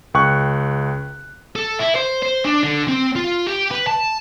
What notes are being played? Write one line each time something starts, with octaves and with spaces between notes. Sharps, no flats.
C#2 G5 C#6 F#6
A4
E4
C5
C5
D4
D3
C4
F4
G4
B4
A5